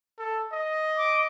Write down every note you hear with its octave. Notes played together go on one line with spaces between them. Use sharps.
A4
D#5
D6